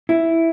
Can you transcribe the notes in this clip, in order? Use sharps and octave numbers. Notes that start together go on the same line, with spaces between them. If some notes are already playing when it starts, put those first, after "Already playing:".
E4